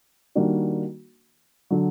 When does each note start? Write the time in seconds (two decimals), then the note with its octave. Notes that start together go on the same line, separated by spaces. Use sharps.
0.35 D#3 G3 A#3 D4 F#4
1.70 D3 F#3